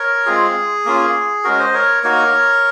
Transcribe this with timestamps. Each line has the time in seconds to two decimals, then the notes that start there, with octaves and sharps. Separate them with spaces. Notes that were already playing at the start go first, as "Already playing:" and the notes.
Already playing: A#4 C#5
0.26 G#3 C4 F4 G#4
0.85 A#3 C#4 F4
1.44 G#3 C#4 F#4 A#4
1.59 C5 D#5
1.74 A#4 C#5
2.03 A#3 D#4 F#4 A#4 C#5